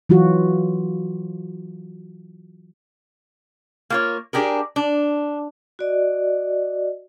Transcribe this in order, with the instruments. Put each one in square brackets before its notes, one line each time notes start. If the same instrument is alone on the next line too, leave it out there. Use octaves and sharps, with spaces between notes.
[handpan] E3 F#3 F4 F#4
[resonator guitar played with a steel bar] A#3 F4 C#5
D4 G4 G#4 A#4
D4
[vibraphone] F#4 D5 D#5